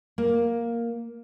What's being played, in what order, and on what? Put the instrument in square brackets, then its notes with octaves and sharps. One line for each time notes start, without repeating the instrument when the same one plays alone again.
[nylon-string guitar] A#3